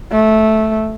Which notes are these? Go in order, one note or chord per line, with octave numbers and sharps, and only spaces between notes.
A3